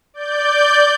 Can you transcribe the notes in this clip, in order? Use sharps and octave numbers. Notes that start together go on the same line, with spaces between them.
D5 G6